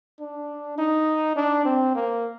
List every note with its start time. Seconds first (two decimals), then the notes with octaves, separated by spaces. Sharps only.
0.20 D4
0.78 D#4
1.36 D4
1.65 C4
1.95 A#3